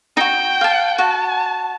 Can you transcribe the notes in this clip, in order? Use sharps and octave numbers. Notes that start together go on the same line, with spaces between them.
D#4 F#4 G5
F5 A5
F#4 F#5 A5